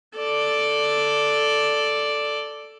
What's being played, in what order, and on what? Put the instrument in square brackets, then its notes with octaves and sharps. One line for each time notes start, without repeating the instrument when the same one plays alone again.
[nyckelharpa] A4 D5